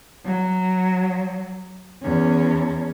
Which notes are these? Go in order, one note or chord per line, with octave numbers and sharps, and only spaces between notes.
F#3
E2 C#4